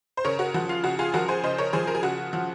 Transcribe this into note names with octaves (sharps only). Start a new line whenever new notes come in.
C5
C#3 A#4 C#5
F#4 A#4
F3 F#4
F4
C#3 F#4
F4 G#4
F3 F#4 A#4
G#4 C5
C#3 C5 D#5
A#4 C#5
F3 G#4 C5
A#4
G#4
C#3 F#4
F3